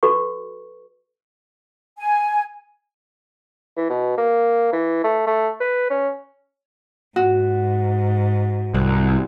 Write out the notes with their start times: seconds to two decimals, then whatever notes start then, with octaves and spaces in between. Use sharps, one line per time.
0.03 F#4 A4 B4 C#6
1.99 G#5
3.77 E3
3.90 B2
4.17 A#3
4.73 E3
5.04 A3
5.26 A3
5.60 B4
5.90 C#4
7.16 G#2 F#4
8.74 C2 F#6